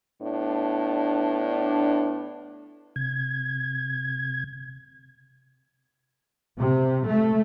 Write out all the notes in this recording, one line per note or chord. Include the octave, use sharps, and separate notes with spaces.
A2 B3 D4
C3 G#6
C3
A3